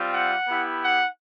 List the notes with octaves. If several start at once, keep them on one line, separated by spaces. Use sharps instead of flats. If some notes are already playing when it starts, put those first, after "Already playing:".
Already playing: G3 C4 F4
F#5
B3 E4 G4
F#5